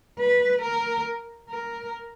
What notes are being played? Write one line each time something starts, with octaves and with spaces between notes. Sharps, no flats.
B4
A#4
A#4